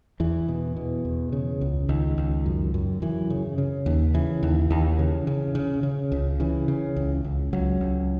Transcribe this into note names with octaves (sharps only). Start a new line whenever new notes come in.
E2 E3
B2
B2
E2
C#3
C#2
C#2 D#3
C#2
F#2
F#2
F#2 E3
C#3
C#3
D#2
C#3 E3
D#2
D#2
C#3
C#3
C#3
C#3
C#2
C#3 E3
C#3
C#2
C#2
C#2 F#3
C#2